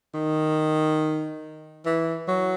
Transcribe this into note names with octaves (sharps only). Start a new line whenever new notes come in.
D#3
E3
F#3